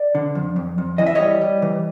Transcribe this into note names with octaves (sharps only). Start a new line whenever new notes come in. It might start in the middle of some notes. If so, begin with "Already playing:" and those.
Already playing: D5
D3
F2
F2
F2
E3 D#5
E5
G3 C#5 D#5
G3
E3